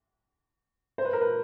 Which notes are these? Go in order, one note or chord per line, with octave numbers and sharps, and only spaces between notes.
C5
B4
A#4
B4